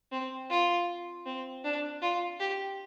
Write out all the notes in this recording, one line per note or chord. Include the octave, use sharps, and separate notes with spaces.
C4
F4
C4
D4
F4
G4